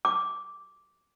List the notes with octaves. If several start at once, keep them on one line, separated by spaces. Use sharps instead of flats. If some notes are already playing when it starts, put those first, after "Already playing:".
D6